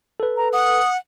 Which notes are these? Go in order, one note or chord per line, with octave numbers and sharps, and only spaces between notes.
A4 B4
A#5
F#5 D#6